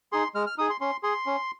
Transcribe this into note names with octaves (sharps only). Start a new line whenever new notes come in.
D#4 G#4 C6
G#3 F6
F6
D#4 G#4 D#6
C6
C#4 C6
G#4 C6
C#4